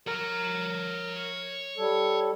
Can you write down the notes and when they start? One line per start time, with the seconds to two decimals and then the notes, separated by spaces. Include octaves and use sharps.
0.07 A#4 C#5 A#5
1.77 G3 A4